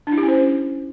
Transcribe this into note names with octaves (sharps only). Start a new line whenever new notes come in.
D4
E4
G4
C#4
C5